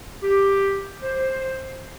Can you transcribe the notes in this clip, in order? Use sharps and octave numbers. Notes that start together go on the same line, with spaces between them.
G4
C5